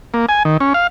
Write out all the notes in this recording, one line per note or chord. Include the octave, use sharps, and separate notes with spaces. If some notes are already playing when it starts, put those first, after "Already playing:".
A#3
G#5
D#3
C#4
F5